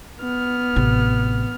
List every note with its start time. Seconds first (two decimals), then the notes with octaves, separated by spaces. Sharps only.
0.21 B3 F6
0.76 A1 C3